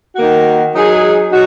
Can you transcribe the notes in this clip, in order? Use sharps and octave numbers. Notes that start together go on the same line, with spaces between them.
D#3 A#3 F#4
F#3 D#4 G#4
F#3 D#4 F#4